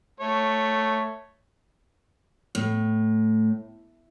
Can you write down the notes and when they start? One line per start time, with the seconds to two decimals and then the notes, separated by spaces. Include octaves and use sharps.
0.20 A3 C#5
2.55 A2